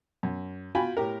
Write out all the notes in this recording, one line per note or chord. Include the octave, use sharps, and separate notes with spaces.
F#2
F4 F#4 G5 G#5 B5
A2 G4 A#4